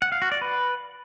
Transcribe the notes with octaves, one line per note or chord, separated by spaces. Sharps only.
F#5
F5
F#4
D5
B4